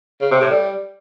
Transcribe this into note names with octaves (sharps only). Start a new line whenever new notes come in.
C#3
C3
A2
G3